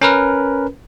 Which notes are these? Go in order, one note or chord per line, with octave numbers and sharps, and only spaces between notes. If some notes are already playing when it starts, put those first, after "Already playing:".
C#4 A#4 B4